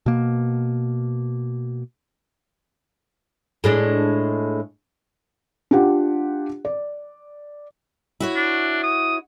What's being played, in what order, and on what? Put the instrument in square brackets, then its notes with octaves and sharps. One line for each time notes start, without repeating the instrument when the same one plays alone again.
[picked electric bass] B2 A#3
[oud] A2 G#3 D4
[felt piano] D4 F4 G4 F#5
D5
[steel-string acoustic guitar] E4 F#4 C#5
[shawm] D4
D#6